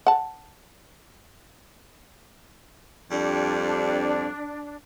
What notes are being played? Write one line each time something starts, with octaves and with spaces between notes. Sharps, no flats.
F#5 A5
F2 G3 D4